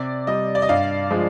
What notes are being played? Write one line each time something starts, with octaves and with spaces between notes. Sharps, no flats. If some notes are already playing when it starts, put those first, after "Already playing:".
Already playing: C3 D5
G3 D#5
D5
D#5
G2 D5 F5
F3 G#3